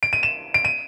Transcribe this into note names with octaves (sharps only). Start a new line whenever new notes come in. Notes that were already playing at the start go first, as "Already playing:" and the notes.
D7
D#7
E7
D7
D#7